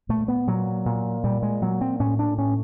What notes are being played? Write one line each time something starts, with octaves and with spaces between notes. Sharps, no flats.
A#2 A3
B3
A#2 F#3
A#2
A#2 G3
G#3
A#2 F#3
C4
A2 C#4
D4
A2 C#4